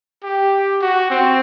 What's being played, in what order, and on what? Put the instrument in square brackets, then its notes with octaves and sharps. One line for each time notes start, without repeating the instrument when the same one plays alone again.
[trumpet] G4
F#4
C4